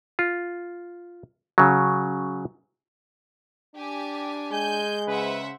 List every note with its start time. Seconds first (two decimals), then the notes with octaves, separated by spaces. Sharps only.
0.19 F4
1.58 C#3 F#3
3.75 D4 G4 G#5
4.52 G#3 G#5 G6
5.07 C#3 B4 C5 E5 F#5